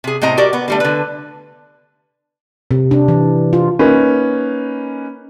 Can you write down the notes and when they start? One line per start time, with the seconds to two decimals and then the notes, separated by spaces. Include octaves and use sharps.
0.04 C3 G#4
0.22 A2 C3 C4 D#5 A#5
0.37 F#4 G4 A#4 D5
0.53 B3
0.68 D3 G3 A3
0.80 D3 B4
2.71 C3
2.91 D4
3.08 E3
3.53 F4
3.79 A#3 C#4 D#4 B4